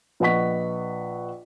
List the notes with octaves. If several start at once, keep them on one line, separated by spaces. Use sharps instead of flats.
A#1 B4 D#5 F#5 C#6 B6